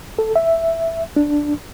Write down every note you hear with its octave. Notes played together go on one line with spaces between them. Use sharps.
A4
E5
D4